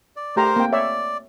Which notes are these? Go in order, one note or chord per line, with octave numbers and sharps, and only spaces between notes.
D5
A3 G4 A#4 C5 A#5
A#3 C4 G5
C#5 D5 E5